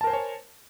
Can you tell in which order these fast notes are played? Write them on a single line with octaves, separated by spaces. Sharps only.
A5 A#4 C5 G#5 C#5